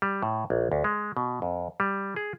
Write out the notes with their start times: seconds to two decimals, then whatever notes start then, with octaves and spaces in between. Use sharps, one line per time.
0.02 G3
0.23 A2
0.50 A#1
0.72 D2
0.84 G#3
1.17 B2
1.42 F2
1.80 G3
2.16 G#4